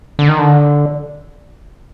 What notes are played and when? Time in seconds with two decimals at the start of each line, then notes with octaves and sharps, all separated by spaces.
0.19 D3
0.29 D#3
0.39 D3